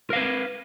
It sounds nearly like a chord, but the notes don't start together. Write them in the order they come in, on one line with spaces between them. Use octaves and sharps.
A#4 F5 B4